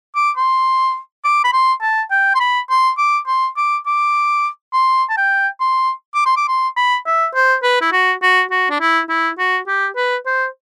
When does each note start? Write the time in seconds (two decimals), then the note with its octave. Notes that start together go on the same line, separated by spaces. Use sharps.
0.16 D6
0.37 C6
1.25 D6
1.44 B5
1.53 C6
1.82 A5
2.11 G5
2.35 C6
2.40 B5
2.70 C6
2.98 D6
3.27 C6
3.57 D6
3.86 D6
4.73 C6
5.10 A5
5.17 G5
5.61 C6
6.14 D6
6.26 C6
6.37 D6
6.48 C6
6.77 B5
7.06 E5
7.35 C5
7.63 B4
7.81 E4
7.93 F#4
8.23 F#4
8.51 F#4
8.70 D4
8.81 E4
9.09 E4
9.38 F#4
9.68 G4
9.96 B4
10.26 C5